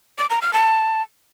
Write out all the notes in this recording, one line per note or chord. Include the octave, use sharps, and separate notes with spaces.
D6
A#5
F6
A5